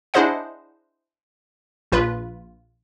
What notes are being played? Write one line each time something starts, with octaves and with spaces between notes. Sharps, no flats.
D4 E4 G#4 C5 D#5 F#5
A#1 F4 B4 B5